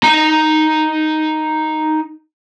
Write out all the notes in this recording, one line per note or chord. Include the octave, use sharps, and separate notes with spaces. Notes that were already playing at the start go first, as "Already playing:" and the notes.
D#4 A#5